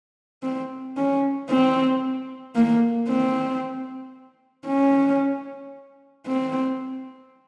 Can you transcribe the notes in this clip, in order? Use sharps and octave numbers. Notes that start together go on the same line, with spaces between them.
C4
C#4
C4
A#3
C4
C#4
C4